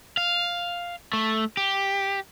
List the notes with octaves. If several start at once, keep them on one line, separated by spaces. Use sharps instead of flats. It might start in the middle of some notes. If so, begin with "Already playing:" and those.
F5
A3
G4